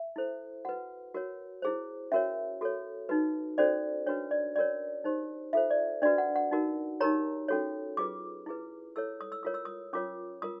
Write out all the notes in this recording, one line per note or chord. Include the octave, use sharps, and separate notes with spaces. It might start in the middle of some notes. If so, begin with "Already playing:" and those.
Already playing: E5
E4 A4 C5
F#4 B4 F#5
F#4 A#4 C#5
E4 G#4 C5
C#4 F#4 A#4 C#5 E5
F#4 A4 C#5
D#4 F#4 B4
C#4 F#4 A4 C5 D5
D4 F#4 B4 C#5
D5
C#4 F#4 A#4 C#5 D5
D#4 G4 C5
F4 A4 C5 E5
D5
D4 F#4 B4 D5
F#5
F#5
D#4 F#4 A#4
D#4 G4 A#4 C#5 A#5
C#4 F#4 A4 C#5
F4 G#4 B4 D6
E4 G#4 B4
E4 A4 C#5 E6
D#6
E6
F4 A#4 C#5 D#6
E6
D#6
C#4 F4 A#4 C#5 D6
F4 A#4 D#6